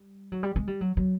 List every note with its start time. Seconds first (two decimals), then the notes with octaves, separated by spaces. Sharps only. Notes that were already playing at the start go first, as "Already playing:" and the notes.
Already playing: G3
0.32 F#3
0.43 G3
0.56 G#3
0.67 G3
0.81 F#3
0.97 F#3